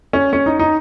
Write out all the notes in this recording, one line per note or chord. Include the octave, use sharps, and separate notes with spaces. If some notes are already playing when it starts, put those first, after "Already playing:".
C#4
C#4
D#4
D#4